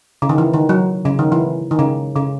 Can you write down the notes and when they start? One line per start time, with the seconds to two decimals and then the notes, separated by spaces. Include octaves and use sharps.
0.22 C#3
0.29 D#3
0.38 E3
0.54 D#3
0.69 F#3
1.05 C#3
1.19 D#3
1.32 E3
1.71 D#3
1.79 C#3
2.16 C#3